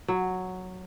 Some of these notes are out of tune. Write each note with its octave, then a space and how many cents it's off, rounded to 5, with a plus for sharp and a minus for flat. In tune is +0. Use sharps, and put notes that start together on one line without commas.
F#3 -5